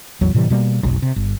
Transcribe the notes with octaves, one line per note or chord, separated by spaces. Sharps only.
A1 E2 F#3
A2 C3 E3 G3
B2 G3 A#3
F1 B1
C3
G1